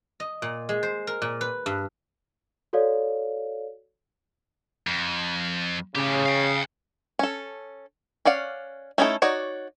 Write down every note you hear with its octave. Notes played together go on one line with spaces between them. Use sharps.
D#5
A#2
G#3
C5
A#4
A#2
B4
G2
F#4 A4 C#5 D5 F5
F2
A2 C#3 G4
F5 G5
C#4 A4
C#4 D5 F5 F#5
A3 C#4 D#4 E4 A4
D#4 F#4 C#5 D5